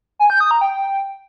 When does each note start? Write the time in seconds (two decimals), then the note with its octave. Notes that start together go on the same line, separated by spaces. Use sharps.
0.19 G#5
0.30 G6
0.40 D#6
0.51 A#5
0.61 G5